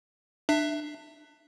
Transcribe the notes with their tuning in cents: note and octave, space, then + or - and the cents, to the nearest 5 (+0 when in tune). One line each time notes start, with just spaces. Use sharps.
D4 +30 E5 +0